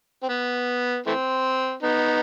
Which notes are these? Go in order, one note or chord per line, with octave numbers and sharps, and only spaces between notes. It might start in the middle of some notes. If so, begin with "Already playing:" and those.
C4
B3
E3 A3 C4
B3 D#4